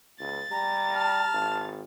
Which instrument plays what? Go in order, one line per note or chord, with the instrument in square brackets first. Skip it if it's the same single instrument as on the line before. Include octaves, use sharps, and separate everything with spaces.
[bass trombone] C#2 [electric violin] A6
[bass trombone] G3 [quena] A#5
[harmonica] A5 F6
[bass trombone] G#1